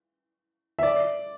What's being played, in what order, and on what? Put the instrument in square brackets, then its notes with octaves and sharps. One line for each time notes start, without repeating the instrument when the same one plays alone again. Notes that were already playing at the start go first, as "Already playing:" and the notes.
[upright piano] E5
D5